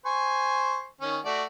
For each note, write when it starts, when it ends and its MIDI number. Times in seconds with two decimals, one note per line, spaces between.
0.06 0.88 72
0.06 0.88 80
0.06 0.88 85
1.01 1.19 51
1.01 1.19 61
1.25 1.44 57
1.25 1.44 66
1.25 1.44 74